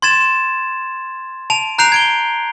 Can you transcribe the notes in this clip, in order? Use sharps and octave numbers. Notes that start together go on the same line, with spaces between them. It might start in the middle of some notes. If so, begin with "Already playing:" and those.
C6 G#6 A6 E7
A5 D7 F7
A#5 F#6 G6 C7 D7 F7
G#6 D7 G7